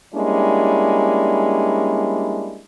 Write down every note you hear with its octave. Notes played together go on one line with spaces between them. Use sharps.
G3 G#3 A#3 C#4 D4 E4